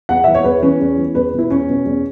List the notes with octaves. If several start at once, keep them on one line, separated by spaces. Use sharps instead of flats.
E2 F#5
E3 E5
C#5
E2 B4
E3 C#4
E2
E3
E2 B4
B2
E4
E2 C#4
B2
E2